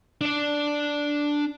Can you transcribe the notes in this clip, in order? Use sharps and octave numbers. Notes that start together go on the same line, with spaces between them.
D4 D5